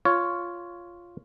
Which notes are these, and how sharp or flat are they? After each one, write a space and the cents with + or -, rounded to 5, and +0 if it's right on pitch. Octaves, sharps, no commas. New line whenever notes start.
F4 +0 C#5 +10